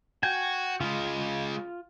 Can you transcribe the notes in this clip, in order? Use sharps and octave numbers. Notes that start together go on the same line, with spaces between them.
F#4 G5 G#5
C#3 G#3 F4